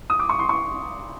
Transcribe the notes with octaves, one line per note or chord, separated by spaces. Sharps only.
D#6
D6
C#6
C6
C#6